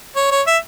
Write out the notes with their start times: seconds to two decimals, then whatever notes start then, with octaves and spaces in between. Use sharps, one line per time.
0.16 C#5
0.31 C#5
0.47 E5